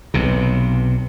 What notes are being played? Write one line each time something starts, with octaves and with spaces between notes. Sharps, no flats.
B1 C3